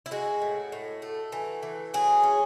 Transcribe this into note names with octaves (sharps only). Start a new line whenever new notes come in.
E4
G#3 F#4
A2
A2
A3
E3
E3
F#3 G#4
C#4